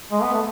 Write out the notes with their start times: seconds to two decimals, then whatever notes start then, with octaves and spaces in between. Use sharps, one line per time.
0.11 G#3
0.22 B3
0.33 A3